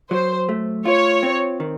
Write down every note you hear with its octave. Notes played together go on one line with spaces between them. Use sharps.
F#3 C5
A3
F4 C#5
C4
D#3